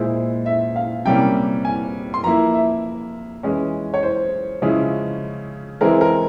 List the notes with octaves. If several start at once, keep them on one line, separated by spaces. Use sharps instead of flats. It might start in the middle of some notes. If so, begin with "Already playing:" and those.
Already playing: A#2 G#3 E4 C5
E5
F5
C3 G3 A#3 C#4 G5
G#5
C6
F3 A#3 E4 A#5
E5
E3 G#3 C#4
C#5
C5
C#3 F3 G#3 C#4 E4
E3 G#3 C4 E4 A#4
A#4